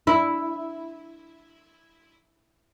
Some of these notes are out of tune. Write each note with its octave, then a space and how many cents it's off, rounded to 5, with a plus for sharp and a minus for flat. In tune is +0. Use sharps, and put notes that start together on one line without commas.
E4 +0